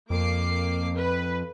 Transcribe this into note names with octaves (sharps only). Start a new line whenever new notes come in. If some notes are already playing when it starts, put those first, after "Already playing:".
F2 A#3 D6 C7
B4